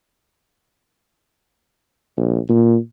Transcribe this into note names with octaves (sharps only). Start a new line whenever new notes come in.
A#1
A#2